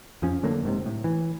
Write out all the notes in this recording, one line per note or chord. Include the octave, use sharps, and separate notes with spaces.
F2 F3 C#4
D3 F#3 A3 A#3
F#1 G#2 C3
A2
E3